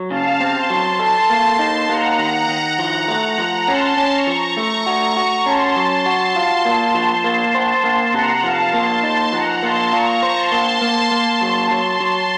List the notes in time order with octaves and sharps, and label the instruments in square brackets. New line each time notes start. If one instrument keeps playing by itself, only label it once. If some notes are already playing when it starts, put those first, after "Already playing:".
Already playing: [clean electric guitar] F#3
[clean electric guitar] C#3 [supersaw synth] F5 A5
[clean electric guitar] C4
[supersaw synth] A5 C6
[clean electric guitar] F#3
[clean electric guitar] A4 [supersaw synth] A5 C6
[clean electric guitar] A#3
D#4
[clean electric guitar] A#3 [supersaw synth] F#5 A#5
[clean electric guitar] D#3
D#3
F3
A3
F3
[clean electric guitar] C#4 [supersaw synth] A5 C6
[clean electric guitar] C#4
[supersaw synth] A#5 C#6
[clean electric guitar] F3
[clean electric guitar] A3 [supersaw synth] A#5 C#6
[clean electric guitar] F#4
F#4
[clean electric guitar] C#4 [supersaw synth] A5 C6
[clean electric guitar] F#3
[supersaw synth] A5 C6
[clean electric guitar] F#4
F4
A#3
F3
A#3
C5
A#3
[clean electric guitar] C3 [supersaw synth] F#5 A#5
[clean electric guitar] F3 [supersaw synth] F5 A5
[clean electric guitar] A#3 [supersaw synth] A5 C6
[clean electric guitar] D#4 [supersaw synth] A5 C6
[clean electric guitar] F3 [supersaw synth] F#5 A#5
[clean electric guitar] A#3 [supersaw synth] A5 C6
[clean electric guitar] F4 [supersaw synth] A#5 C#6
[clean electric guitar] C5
[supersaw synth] A5 C6
[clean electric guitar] A#3
A#3
A#3
F#3
[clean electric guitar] F#3 [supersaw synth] A5 C6
[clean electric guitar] F#3